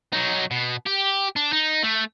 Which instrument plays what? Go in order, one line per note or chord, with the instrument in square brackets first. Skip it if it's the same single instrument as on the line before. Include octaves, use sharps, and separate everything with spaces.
[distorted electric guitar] F#3 D#4
B2
G4
D4
D#4
A3